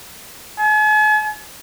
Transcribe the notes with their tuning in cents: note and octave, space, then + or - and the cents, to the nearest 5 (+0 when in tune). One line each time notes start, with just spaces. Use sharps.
G#5 +45